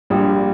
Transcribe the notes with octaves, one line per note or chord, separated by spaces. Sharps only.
A#1 A#2 G3